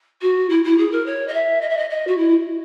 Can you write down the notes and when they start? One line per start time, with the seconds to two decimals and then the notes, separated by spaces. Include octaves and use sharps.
0.21 F#4
0.49 E4
0.64 E4
0.78 G#4
0.91 A#4
1.06 C#5
1.27 D#5
1.33 E5
1.61 D#5
1.69 E5
1.77 D#5
1.90 D#5
2.07 F#4
2.17 E4